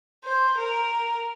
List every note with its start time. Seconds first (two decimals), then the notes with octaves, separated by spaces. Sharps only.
0.24 C5
0.57 A#4